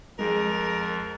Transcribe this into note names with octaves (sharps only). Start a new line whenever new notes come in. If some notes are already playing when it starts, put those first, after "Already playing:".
F2 G#3 A#4